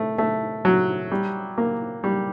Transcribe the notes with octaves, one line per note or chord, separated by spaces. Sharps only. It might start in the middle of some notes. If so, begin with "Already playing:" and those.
Already playing: A3
A3
F#3
G3
A#3
G3